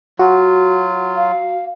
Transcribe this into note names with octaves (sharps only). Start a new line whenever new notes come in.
F#3 F4 F#4
F5